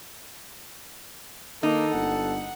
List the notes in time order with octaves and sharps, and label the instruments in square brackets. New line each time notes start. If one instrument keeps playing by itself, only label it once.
[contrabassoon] D#3 [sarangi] A#3 [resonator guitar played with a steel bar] D#4 [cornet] A4
[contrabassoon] G1 [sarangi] F#5